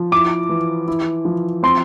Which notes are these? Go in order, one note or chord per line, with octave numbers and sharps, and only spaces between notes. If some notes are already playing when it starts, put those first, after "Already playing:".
Already playing: F3
E4 D6
E3
E4
F3
C4 C6